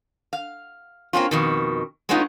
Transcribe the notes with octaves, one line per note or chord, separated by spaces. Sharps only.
F5
A#3 C4 C#4 F4
F2 B2 D#3
G#3 A3 B3 C#4 D#4 F4